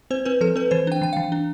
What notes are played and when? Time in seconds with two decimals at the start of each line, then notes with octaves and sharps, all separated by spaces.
0.11 C4 C5
0.25 C4 B4
0.41 F3 A4
0.56 C4 B4
0.71 E3 C5
0.87 D4 G5
1.02 E3 G5
1.13 E3 F5
1.32 D4